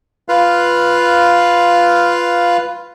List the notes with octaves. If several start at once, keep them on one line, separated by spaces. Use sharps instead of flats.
F4 B4 F5